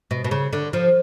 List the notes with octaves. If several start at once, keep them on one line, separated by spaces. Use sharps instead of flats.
B2
B2
C#3
D3
F3